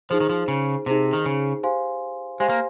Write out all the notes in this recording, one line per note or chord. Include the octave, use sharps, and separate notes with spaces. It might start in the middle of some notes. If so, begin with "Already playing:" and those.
F3 D#4 G#4 C5
D#3
F3
C#3
C3 D#4 G#4 C5
D#3
C#3
G4 C5 F5 G#5 C6
G#3 G4 C5 F5 G#5 C6
A#3